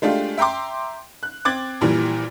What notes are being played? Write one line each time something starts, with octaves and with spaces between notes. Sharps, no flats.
G#3 A3 D4 F4 G4
E5 G5 A#5 C6 D6
F#6
C4 D6 G#6 A6 F#7
A#1 A#2 E3 G3